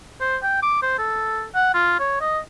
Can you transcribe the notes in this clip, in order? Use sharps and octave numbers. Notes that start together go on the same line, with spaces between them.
C5
G5
D6
C5
A4
F#5
F4
C#5
D#5